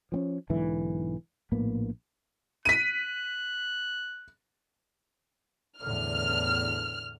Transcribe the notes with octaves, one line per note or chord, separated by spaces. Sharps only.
F3 C4 C#4
B1 G#2 D3 E3
A#1 A2 A#3 B3
F#6 B6 D#7
E2 A2 D3 F6